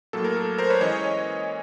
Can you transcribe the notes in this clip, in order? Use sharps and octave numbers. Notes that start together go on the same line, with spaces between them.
A2 F#3 A#3 A4
A#4
A4
A#4 C5
B4 C#5
E3 G#3 C#4 C#5 D#5